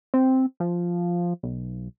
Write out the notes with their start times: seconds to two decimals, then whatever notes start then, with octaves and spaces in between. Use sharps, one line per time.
0.14 C4
0.60 F3
1.43 B1